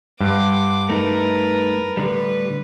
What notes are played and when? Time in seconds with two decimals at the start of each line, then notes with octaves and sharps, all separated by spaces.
0.21 G2 F#5 C6 D6
0.90 A3 D#4 E4 A#4 B4 A5
1.97 A2 D3 G3 B4